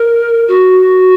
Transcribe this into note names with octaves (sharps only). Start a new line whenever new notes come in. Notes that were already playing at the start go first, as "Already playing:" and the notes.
Already playing: A#4
F#4